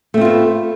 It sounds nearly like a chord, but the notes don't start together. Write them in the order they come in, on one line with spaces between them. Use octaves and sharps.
A3 C4 F4 B3